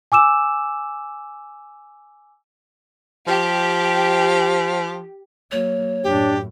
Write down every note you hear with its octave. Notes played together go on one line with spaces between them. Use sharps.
G#5 D6 E6 E7
F3 G4
F#3 A#3 C#5
F#2 A2 D4 G4